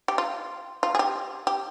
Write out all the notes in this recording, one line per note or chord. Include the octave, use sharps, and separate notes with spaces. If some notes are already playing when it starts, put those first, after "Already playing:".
G4
F4
F4
G#4
G4
G4